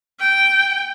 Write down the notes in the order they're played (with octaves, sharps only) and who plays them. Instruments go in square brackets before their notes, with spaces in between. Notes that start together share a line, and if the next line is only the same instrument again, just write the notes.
[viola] G5